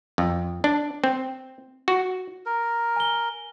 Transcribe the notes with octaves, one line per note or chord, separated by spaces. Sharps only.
F2
D4
C4
F#4
A#4
G#5 G7